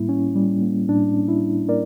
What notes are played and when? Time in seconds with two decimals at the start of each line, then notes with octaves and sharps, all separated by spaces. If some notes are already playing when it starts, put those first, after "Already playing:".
Already playing: A2 G3 A#3 E4
0.09 C#4
0.35 G3
0.62 A#3
0.89 A2 D4
1.15 C#4
1.28 E4
1.42 G3
1.68 A#3 A#4 D5